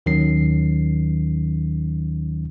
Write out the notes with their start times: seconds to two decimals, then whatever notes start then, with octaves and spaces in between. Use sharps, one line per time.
0.06 D#2 D#3 F#3 C#4 C7